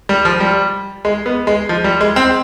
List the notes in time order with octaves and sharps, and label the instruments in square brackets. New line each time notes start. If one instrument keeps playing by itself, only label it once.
[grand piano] G3
F3
G3
G#3
B3
G#3
F3
G3
G#3
C4